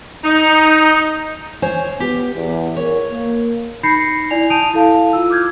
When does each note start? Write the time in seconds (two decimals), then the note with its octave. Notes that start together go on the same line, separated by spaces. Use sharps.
0.24 D#4
1.62 C5 C#5 G#5
2.00 B3 G4
2.34 E2
2.77 A#4 C#5
3.09 A#3
3.83 D#4 B5 G6 A#6 C7 C#7
4.30 E4 D5 G#5 F7
4.50 A5 D#6 G6 D7 D#7 F7
4.74 E4 A4 F5 A5
5.13 F4 E6
5.30 D6 F6 G6 G#6